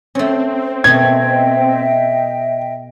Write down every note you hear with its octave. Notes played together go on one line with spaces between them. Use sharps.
A3 C4 C#4
B2 A3 D#5 E5 G5 G#6